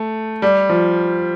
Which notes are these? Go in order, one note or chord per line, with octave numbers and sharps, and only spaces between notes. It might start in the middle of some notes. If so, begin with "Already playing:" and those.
Already playing: A3
G3
F3